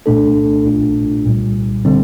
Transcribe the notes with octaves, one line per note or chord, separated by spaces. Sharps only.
C2 A#2 A3 D4 A4
A#1 A#2 A3 D4 F4
C2 A#2 G3
D3 G3 C4